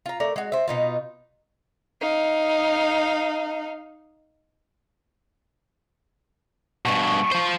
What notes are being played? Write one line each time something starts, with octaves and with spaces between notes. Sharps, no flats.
F4 A#5
A3 A#4 D5
G#3 F#4
C5 E5
B2 D#4 F4
D#4 F5
G2 B2 C#6
F3 C5